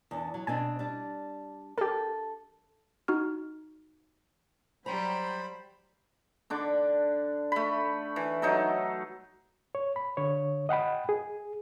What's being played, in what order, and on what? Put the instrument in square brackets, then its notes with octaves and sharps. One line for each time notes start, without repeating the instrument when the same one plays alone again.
[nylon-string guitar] E2 D4
F#3
[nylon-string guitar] B2 C4 D4 [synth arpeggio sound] G#5
[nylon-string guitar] G3 D4
[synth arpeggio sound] G4 A#4 [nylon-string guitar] A4
[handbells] D#4 F#4 F6
[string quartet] F#3 G3 [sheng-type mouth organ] C5 B5 [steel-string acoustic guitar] A#5
[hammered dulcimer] D3 D4 D6
A3 B5
E3
F#3 D#4 A4
[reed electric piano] C#5
B5
D3 C#5
D#5 F#5 G5 B5
G#4